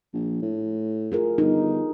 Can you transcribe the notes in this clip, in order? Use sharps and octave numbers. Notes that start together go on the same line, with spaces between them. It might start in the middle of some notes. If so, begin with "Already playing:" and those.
A#1
A2
F4 G#4 A#4
G1 D#4